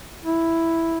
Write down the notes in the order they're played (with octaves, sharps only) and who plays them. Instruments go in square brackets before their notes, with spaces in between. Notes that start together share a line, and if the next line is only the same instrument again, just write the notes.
[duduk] E4